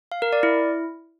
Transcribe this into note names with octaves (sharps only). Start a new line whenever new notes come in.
F5
A#4
D5
E4